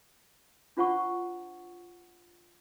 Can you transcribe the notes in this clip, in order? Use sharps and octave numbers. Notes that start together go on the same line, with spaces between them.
D4 F4 C5 F#5 A5 C#6